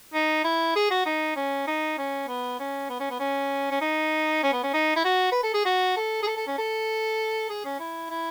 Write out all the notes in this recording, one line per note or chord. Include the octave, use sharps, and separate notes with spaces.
D#4
E4
G#4
F#4
D#4
C#4
D#4
C#4
B3
C#4
B3
C#4
B3
C#4
C#4
D#4
C#4
B3
C#4
D#4
E4
F#4
B4
A4
G#4
F#4
A4
G#4
A4
A4
C#4
A4
G#4
C#4
E4
E4